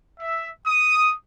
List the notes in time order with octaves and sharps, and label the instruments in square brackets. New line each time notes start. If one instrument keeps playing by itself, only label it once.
[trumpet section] E5
D#6